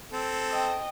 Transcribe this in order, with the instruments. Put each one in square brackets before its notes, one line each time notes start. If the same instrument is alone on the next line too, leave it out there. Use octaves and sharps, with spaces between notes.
[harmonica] C4 A4
[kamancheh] D#5 G5